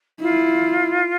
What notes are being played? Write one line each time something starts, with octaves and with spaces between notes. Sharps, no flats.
E4 F4